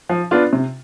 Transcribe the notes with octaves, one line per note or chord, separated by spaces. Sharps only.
F3
B3 D4 F4
C3